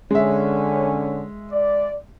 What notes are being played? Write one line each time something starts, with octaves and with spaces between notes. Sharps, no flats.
D3 G#3 C#4 E5
D5